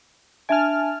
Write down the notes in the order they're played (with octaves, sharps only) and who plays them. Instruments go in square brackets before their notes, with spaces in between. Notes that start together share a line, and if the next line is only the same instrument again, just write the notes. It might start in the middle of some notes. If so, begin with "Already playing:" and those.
[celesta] D4 E5 D7 [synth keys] G#5 A5 F6